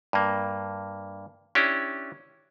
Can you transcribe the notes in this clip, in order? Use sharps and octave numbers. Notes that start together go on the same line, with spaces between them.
G2 A#3
C#4 D4 E4 G4